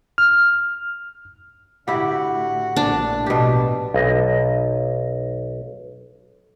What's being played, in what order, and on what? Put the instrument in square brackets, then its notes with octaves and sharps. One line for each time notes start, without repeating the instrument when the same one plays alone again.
[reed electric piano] F6
[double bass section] A2 D3 [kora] E4 G4 [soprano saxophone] F#4
[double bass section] A#1 A2 [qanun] D4
[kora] B2 G4 [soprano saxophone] A5
[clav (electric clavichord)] B1 D#5